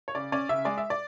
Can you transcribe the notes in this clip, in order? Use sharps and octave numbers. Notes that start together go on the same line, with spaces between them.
C#5
C#3 D5
C#4 D5
C#3 E5
G#3 D5
E5
D5